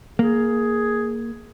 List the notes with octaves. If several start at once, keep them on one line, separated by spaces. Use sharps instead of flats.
A#3 G#4